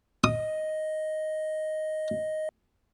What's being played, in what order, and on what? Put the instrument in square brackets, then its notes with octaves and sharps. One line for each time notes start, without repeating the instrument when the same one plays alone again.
[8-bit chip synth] D#5 [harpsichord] D#6